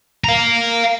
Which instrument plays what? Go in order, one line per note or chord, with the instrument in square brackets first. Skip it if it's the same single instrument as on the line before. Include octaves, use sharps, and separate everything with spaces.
[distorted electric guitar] F5 A#5